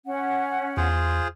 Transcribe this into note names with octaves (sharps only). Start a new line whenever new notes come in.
C#4 F#5
E2 F4 G#4 C5